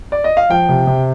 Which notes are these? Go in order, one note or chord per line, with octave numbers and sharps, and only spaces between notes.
D5
D#5
F5
F3 G5
C3
C3